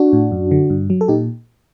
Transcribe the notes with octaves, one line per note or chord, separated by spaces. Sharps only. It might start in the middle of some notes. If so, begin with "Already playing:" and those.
Already playing: D4 F#4
A2
F#2
D3
G2
F#3
A4
A#2 D#4 G4